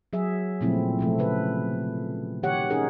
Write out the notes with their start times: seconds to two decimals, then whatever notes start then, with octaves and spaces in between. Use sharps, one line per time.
0.13 F#3 G#4 E5
0.61 A#2 C#3 F3 A3 C4 E4
0.99 C3 F3 A3
1.18 C#3 B4
2.43 D#3 G4 C#5 F#5
2.70 C#4 D#4 G#4 A#4